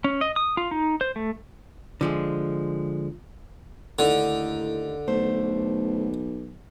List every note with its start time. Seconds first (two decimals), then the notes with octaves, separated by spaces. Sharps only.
0.04 C#4
0.21 D#5
0.36 D#6
0.57 F4
0.71 D#4
1.01 C5
1.16 A3
2.01 D3 F3 G#3
3.99 D#2 A2 D3 D#4
5.07 B1 E2 A3 C5